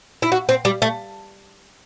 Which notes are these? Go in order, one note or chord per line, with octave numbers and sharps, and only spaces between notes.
E4
F#4
C4
G3
A3